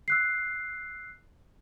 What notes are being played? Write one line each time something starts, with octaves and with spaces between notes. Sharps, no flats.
E6 F#6 C7